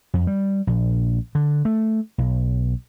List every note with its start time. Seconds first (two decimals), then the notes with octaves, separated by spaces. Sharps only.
0.14 F2
0.27 G3
0.67 A#1
1.35 D3
1.65 A3
2.18 B1